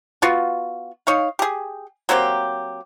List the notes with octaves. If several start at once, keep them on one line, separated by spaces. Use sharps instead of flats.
B3 F4 F#4
D#4 C#5 F5
G4 G#4
F#3 A#3 C4 G4